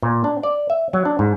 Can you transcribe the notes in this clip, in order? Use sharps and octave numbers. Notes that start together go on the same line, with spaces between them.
A#2
D4
D5
E5
F#3
D4
G#2